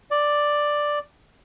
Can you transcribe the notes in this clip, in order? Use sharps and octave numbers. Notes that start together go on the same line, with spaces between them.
D5